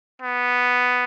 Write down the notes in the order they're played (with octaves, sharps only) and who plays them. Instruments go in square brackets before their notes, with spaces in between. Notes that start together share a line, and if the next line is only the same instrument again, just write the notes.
[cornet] B3